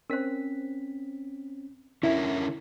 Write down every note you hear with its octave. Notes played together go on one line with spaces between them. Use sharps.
C4 C#4 A#4 C5 B6
D3 C#4 E4 A#4 E5